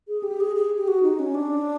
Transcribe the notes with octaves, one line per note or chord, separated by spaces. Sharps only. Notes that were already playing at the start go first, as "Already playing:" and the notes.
G#4
G4
G#4
G#4
G4
F#4
D#4
C#4
D4